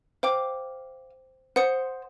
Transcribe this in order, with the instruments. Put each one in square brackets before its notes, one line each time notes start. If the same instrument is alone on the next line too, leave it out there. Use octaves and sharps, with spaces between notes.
[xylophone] C5 G5 D6 [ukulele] F5
[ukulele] C5 [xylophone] F#5 D#6 C#7